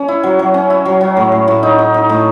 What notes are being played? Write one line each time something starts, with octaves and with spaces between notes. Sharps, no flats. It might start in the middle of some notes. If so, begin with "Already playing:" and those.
Already playing: C#4
E4
F#3
F#3
C#4
E4
F#3
F#3
A2
A2
A2
D#4
D#4
D#4
A2